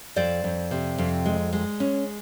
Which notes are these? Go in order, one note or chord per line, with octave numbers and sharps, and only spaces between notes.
F2 C5 D5
F2
C3
F2
G#3
G#3
C#4